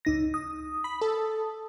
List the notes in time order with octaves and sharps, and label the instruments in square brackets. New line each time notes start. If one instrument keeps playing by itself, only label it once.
[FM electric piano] C#2 D#4 A#6
D#6
[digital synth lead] B5
A4